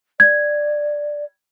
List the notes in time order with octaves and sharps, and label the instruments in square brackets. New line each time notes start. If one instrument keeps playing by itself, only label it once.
[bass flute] D5 [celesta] G#6